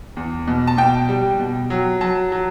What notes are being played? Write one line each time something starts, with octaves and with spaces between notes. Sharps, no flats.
E2
B2
A5
B2 G5
G3
B2
F#3
F#3 A5
F#3